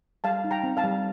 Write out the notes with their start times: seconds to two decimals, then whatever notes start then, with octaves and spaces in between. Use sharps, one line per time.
0.24 G3 F5 A5
0.44 D#4
0.51 G5 A#5
0.64 C4
0.77 F5 A5
0.84 G3